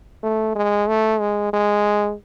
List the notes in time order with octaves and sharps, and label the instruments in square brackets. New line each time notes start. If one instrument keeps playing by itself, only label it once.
[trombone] A3
G#3
A3
G#3
G#3